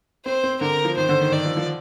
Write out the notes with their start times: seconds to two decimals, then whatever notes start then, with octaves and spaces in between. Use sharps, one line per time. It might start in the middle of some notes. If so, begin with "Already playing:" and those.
0.25 C4 C5
0.44 C4
0.61 D3 A#4
0.85 F3
0.97 D#3 C5
1.09 D3
1.21 D#3
1.32 D#3 D5
1.45 F3
1.57 F3